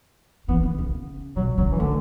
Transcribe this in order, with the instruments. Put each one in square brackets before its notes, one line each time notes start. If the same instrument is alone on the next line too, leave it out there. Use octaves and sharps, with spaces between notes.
[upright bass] E3 [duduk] B3
[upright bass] D3
C#3
[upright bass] B2 [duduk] F#3
[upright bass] C#3 [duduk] F#3
[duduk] E3
[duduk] D3 [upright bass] A3